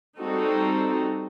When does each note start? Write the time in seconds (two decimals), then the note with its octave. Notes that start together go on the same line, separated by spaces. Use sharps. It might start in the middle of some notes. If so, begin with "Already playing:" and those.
0.20 G3 C4 D#4 F#4 A4